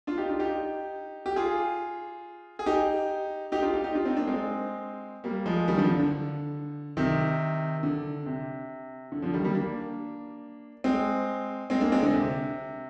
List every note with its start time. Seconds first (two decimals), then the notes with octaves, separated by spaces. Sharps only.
0.07 D4 F4
0.18 D#4 G4
0.29 D4 F4
0.40 D#4 G4
1.26 G4
1.36 F4 G#4
2.59 G#4
2.66 D#4 G4
3.52 D#4 G4
3.62 D4 F4
3.73 D#4 G4
3.84 D#4 G4
3.95 D4 F4
4.05 C4 D#4
4.17 A#3 D4
4.27 G#3 C4
5.24 G3 A#3
5.46 F3 G#3
5.68 D#3 G3
5.78 D3 F3
5.89 D3
6.00 D3
6.97 C3 D#3
7.83 D3
8.26 C3
9.12 D3
9.22 D3 F3
9.33 D#3 G3
9.44 G3 A#3
9.55 A#3 D4
10.84 G#3 C4
11.70 G#3 C4
11.81 A#3 D4
11.92 G#3 C4
12.03 D3
12.13 C3